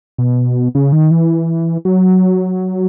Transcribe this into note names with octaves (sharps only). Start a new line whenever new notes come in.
B2
C#3
D#3
E3
F#3